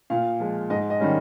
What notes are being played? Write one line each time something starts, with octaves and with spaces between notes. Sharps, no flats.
A#2 F5
F3 G#3
G#2 D#5
D#5
D#3 G3 C#4